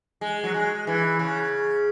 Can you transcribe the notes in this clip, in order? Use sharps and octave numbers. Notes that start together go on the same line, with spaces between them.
G#3
F#3
G#3
E3
C#3